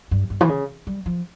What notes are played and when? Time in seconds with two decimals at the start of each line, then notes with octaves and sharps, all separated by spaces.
0.11 G2
0.30 G2
0.41 E3
0.49 C#3
0.87 G3
1.06 F3